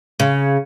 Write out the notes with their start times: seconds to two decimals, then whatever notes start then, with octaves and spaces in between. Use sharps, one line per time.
0.20 C#3